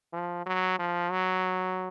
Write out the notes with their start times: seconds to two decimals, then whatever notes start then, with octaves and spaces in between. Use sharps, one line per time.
0.13 F3
0.46 F#3
0.79 F3
1.11 F#3